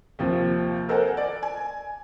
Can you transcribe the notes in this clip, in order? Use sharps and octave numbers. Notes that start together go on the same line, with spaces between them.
D#2 C3 F3
A4 A#4 C5 D#5 F#5 G#5
D5
G#5